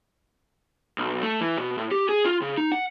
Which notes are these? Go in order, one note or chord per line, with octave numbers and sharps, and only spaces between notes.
B1
A3
E3
B2
A2
G4
G#4
F4
C#3
D#4
F#5